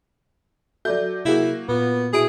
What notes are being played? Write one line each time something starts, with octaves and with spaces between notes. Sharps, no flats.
F#3 F#4 A4 D5 E5 G6
C3 F#3 A#3 E4 F#4 G#4
A#2 B3 F4
B2 E4 G#4 D7